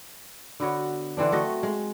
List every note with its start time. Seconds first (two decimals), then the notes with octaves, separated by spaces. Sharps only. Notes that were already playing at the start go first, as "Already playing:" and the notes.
0.60 D3 B3 F#4 C#5
1.17 D3 E3 C4 D4
1.32 A3 F#4 D#5
1.63 G#3